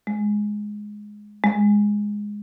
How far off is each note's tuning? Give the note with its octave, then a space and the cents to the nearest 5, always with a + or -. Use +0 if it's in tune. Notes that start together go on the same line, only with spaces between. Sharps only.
G#3 +5
G#3 -5